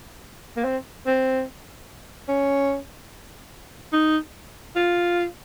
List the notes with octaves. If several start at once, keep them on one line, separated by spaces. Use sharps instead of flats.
A#3
C4
C4
C#4
D#4
F4